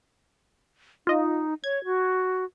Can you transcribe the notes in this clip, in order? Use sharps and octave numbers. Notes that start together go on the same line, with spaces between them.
D#4 F4 D#5
C#5 G#6
F#4